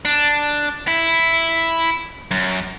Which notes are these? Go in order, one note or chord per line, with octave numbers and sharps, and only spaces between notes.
D4
E4
F#2